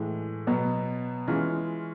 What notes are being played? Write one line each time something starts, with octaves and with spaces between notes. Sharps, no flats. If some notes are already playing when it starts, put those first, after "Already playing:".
Already playing: A2 E3 G#3
B2 F#3 B3
E3 G#3 C#4 F4